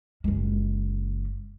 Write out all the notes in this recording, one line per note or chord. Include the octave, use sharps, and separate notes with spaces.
F#1 G#3